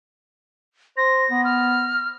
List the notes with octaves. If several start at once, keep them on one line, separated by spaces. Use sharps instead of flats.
C5 A#6
B3
F6